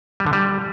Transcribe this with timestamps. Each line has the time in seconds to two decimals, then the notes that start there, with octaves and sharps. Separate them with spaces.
0.20 G3
0.26 D3
0.33 G3